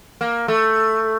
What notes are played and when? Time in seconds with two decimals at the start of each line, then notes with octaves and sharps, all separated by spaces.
0.21 A#3
0.48 A3